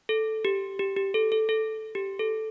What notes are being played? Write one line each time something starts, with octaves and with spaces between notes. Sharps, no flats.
A4
G4
G4
G4
A4
A4
A4
G4
A4